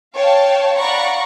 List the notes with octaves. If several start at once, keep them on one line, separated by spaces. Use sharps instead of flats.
C#5 F5 G5 A5
D5 F5 F#5 A#5 B5 C#6